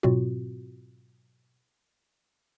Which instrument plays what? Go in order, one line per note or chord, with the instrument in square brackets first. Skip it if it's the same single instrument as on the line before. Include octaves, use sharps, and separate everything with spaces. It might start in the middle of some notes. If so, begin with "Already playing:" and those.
[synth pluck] G#2 B2 F#3 C4 F4 F#4